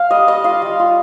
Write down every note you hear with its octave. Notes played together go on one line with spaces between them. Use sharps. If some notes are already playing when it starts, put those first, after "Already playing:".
Already playing: F5
G3 D#5
G3 D#5
F4 F5
G3
F4